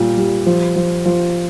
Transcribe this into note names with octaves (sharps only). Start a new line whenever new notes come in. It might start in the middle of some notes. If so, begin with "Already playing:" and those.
Already playing: A#2 G3
G3
F3
F3
F3